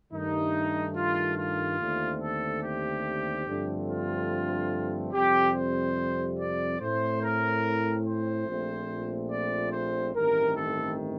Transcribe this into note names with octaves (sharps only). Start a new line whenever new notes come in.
G2 D#3 A3 D#4
F4
F4
D#2 D3 A3 C4
A4
G4
G2 D3 F3 A3 C4
F4
F2 C3 G3 C4 G4
C5
D5
A2 A3 C4 C5
A#4
C5
A#1 A#2 A3 C4
D5
C5
A1 G2 D#3 A3 C4 A#4
A4